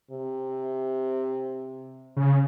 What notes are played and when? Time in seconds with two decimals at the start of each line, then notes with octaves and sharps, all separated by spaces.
0.11 C3
2.17 C#3